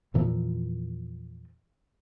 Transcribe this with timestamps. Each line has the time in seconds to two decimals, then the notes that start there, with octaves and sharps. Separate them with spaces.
0.14 E2 A#2 E3 F3